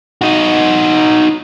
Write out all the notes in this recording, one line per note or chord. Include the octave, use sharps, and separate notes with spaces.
D#4 F#4